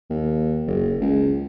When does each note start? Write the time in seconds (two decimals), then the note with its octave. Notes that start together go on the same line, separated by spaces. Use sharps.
0.10 D#2
0.67 F#1
1.01 C#2